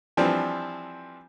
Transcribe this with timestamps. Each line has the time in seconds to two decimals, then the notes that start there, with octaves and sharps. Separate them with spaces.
0.17 E3 F3 G3 C4 D4